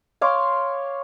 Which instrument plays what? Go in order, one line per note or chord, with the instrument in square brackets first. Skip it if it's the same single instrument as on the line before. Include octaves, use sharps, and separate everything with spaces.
[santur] C#5 F5 C6 D6